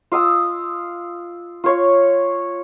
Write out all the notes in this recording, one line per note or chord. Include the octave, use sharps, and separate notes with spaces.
F4 F5 D#6 E6
F4 C#5 F5